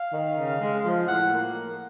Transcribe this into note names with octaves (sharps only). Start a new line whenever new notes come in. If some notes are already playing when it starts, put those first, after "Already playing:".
Already playing: F5
D#3
C#3
G#3
F3
A2 F#5
A#3